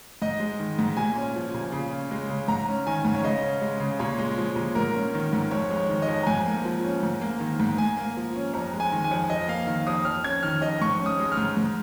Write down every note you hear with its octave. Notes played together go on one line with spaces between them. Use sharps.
G#2 D#5
G#3
D#3
G#2
A#2 G#5
C#4
F3
A#2
C#3
C#4
G#3
C#3
G#2 A#5
C#4
D#3 G#5
G#2
C#5
C#3 D#5
C#4
G#3
C#3
A#2 C#5
G#3
F3
A#2
G#2 A#4
C#4
D#3
G#2
F2 C#5
G#3
C#5
D#3
D#5
F2
A#5
G#2 G#5
A#3
F3
C#4
G#2
A#3
D#3
G#2
G#2 G#5
A#3
F3
C#4
F2 A#5
G#3
G#5
D#3
G#5
F2
F2 D#5
A#3 F5
D#3 F5
F2 D#6
F2 F6
C#4 G#6
D#3 F6
F2 D#5
G#2 C#6
C#4
D#6
G#3
F6
G#2
G#2